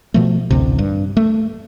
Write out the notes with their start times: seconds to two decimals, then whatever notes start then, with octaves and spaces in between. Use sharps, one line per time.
0.14 B2 F3 A3
0.50 A1 D2 C3
0.78 G2
1.17 A3